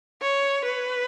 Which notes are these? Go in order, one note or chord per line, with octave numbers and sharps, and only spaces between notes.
C#5
B4